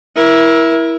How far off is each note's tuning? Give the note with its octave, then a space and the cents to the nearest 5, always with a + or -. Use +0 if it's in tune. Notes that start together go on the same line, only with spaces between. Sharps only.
E4 +0 A#4 +30